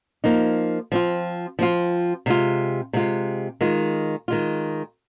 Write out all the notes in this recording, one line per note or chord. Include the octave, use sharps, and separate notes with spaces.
F3 A#3 D#4
F3 C4 F4
F3 C4 F4
C3 G#3 F4
C3 G#3 F4
D#3 G#3 F4
D#3 G#3 F4